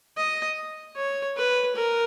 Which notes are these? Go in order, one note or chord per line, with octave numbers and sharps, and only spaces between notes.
D#5
C#5
B4
A#4